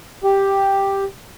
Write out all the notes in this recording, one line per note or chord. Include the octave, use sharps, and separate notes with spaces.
G4